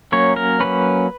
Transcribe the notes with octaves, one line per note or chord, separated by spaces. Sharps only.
F#3 A#3 C#4 C#5
A#4
F#3 A#3 C#4 B4